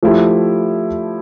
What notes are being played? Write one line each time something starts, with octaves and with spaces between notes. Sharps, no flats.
F3 A3 E4 G4